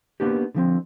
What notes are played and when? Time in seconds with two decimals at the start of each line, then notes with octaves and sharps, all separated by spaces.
0.20 A#3 B3 D4 F#4 G4
0.55 D3 F3 C4